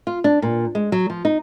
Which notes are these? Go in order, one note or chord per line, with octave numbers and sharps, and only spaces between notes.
F4
D4
A#2
G#3
F#3
F3
D#4